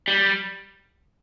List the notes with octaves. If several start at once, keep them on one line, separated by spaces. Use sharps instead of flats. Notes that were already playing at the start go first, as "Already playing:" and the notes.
G3